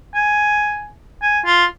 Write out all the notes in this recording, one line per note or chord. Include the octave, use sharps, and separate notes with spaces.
G#5
G#5
F4